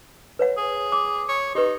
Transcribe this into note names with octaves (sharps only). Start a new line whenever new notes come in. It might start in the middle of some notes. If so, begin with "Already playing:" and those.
B4 C#5 F#5
G#4
D6
C#5
D#4 G4 B4